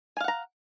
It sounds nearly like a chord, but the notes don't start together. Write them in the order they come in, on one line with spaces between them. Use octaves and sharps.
G#5 F5 F#5 A#5